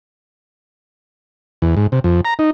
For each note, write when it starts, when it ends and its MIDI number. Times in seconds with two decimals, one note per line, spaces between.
1.62 1.75 40
1.77 1.87 44
1.92 1.99 48
2.04 2.21 41
2.25 2.34 82
2.39 2.50 63